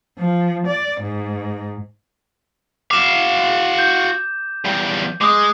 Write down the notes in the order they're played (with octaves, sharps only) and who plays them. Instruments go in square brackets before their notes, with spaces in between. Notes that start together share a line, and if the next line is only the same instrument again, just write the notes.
[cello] F3
D5
G#2
[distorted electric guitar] F#4 F5 [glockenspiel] D6 E7
[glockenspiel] G6
[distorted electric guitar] E2 G3
[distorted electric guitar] G#3 [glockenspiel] D6 D#6